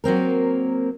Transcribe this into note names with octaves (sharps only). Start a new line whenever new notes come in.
F#3 A#3 C4 A#4